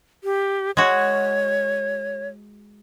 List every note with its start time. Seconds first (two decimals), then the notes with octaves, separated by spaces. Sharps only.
0.24 G4
0.77 G#3 F#4 C#5